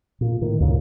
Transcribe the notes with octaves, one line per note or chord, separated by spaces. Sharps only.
A#2
A2 D#3
D2 G2 A#2 C#3